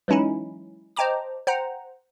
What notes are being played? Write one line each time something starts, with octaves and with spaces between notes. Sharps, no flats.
E3 F#3 G#3 C#4 D#4 E4
C5 D#5 G5 A5 A#5 D6
C5 F#5 G5 A#5